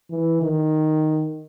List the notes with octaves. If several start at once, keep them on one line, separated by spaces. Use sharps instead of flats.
E3
D#3